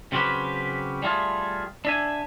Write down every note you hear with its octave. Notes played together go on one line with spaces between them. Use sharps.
C#3 F#3 C4 C#4 G4 B4
G3 A3 F4 G#4
D4 E5 G#5